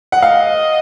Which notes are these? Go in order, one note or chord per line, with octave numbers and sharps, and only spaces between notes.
F#5
D#5 F5